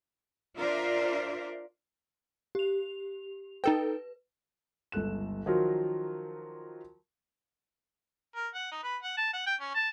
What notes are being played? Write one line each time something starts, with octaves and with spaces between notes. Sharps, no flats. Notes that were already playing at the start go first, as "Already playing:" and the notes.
D4 F4 A#4 C5 D5 E5
G4 F7
D#4 A4 B4 G5
G1 C#2 A4 F#6 E7
D#3 F3 F#3 F4 F#4 A#4
A#4
F#5
D#4
B4
F#5
A5
F#5
G5
C#4
A5